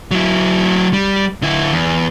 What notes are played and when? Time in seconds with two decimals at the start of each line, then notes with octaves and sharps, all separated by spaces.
0.11 F#3 E4
0.93 G3
1.42 D3 E4
1.72 E2